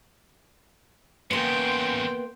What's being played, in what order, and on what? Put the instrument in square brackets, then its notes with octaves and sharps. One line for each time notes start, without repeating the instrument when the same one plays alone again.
[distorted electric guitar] E2 C#3 [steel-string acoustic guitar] A#3 B3 [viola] G5 C6